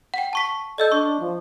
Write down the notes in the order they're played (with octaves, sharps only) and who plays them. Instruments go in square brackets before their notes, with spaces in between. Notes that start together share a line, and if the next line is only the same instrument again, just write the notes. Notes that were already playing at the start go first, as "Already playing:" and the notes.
[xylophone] F#5 G5
A5 C#6 B6
[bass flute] A4 [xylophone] D5 D#5 G6
[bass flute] D4 [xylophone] C#6
[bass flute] F3